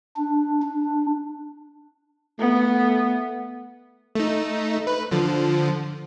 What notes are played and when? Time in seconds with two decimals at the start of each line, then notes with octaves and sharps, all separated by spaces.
0.17 D4
0.62 D4
2.39 A3 B3
4.15 A3 D#4
4.87 B4
5.11 D3 F3